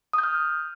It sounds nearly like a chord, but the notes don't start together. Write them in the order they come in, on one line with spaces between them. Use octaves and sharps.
D#6 G6 F6